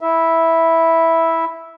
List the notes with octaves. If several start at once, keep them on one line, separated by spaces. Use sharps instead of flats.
E4 E5